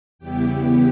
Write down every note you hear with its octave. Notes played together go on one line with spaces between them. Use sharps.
E2 C#3 G3 B3 E4 G4 G5